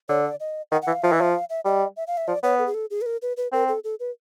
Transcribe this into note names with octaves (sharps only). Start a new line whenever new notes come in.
D3 C#5
D5
D#5
D#3 F#5
F#5
E3
F5
F3 E5
E3 D#5
F3 E5
F5
E5
G3 D#5
E5
F5
E5
F3 D5
B3 C#5
A4
G#4
A4
G#4
B4
A#4
B4
B4
C4 A#4
A4
A4
B4